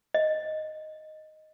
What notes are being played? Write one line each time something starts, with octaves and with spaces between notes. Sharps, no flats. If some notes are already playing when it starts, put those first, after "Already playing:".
D#5